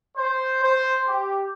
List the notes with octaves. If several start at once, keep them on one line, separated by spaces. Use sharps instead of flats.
C5
C5
G4